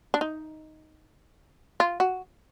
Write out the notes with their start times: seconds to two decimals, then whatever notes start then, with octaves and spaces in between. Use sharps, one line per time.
0.14 D4
0.21 D#4
1.80 F4
2.00 F#4